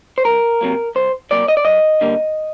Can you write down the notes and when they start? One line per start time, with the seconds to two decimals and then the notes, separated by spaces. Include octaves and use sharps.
0.18 C5
0.25 C2 A#4
0.61 C3 F#3 A#3
0.95 C2 C5
1.31 C3 F#3 A#3 D5
1.48 D#5
1.57 D5
1.65 F#2 D#5
2.01 D3 G3 A#3